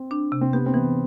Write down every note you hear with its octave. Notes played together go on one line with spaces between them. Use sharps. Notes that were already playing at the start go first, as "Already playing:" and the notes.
Already playing: C4
D4
C3
C4
B3 G4
C4
E3 B3